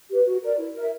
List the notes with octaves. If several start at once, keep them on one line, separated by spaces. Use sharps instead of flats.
G4 B4
F#4
A#4 D5
E4
A#4 E5